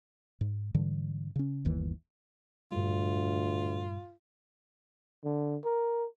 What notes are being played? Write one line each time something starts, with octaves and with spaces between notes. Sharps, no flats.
G#2
G#2 D3 E3 G3
C#3 C#4
G1 D#2 D#3 E3
D2 G2 A#2 G3 F4
D3
A#4